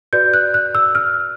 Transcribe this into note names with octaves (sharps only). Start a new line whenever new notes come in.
F#4 B4 D5 G6
F#6
F#6
E6
F6